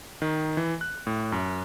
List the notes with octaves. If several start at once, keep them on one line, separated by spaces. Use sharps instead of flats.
D#3
E3
F#6
A2
F#2